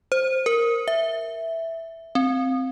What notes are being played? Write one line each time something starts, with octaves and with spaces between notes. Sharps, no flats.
C5
A#4
E5
C4